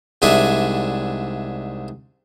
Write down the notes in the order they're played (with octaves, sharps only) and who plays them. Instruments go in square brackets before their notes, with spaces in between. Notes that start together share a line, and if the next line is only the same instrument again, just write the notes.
[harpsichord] C2 G#2 D4 G#4 E5